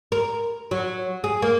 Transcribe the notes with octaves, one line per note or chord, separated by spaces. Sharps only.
A#4
F#3
G#4
A#3